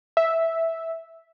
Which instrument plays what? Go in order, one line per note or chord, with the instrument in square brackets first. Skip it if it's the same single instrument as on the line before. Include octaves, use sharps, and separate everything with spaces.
[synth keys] E5